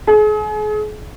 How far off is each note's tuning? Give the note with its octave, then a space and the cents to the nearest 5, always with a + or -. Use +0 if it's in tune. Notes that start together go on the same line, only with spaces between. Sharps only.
G#4 +35